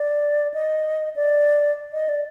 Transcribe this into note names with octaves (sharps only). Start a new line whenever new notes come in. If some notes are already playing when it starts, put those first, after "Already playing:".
Already playing: D5
D#5
D5
D#5
D5